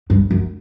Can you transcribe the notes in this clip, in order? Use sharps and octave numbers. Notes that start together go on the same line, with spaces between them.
G2
F#2